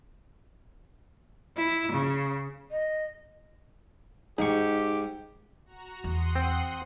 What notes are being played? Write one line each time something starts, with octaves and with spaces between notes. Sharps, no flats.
E4
C#3
D#5
G#2 D#4 G4 C#6
F#4 A#5
E2 F#5 C6 D#6
C4